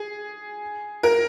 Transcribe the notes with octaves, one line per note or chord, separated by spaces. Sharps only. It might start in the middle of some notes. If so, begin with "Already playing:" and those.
Already playing: G#4
A#4